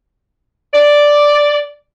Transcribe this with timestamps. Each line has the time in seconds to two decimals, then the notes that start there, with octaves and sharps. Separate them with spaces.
0.74 D5